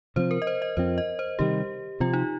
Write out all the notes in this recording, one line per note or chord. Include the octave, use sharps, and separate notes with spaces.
C3 F3 C4 C5
A#4
D#5
C5
D#5
F2 F3 C4 C5
D#5
C5
C3 D#3 G3 G4
C3 F3 C4 F4
D#4